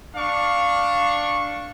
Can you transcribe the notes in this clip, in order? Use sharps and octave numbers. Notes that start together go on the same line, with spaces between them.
D4 F5 C#6